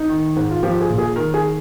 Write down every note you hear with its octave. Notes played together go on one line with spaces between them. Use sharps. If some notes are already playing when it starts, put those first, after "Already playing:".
Already playing: D#4
D#3
G#2
F4
F3 G4
G#4
A#2
G#4
D#3 A#4
G#4